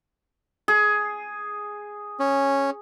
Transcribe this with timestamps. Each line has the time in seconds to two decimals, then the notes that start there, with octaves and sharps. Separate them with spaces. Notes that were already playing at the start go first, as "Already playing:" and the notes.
0.68 G#4
2.20 C#4